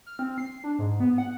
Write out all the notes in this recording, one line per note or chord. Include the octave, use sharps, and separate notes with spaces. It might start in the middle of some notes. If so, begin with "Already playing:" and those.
F6
C4
C7
D4
G#2
B3
F#5